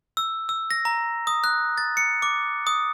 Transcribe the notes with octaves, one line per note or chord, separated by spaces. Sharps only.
E6
E6
A#6
A#5
D#6
F#6
A6
C#7
D6
D#6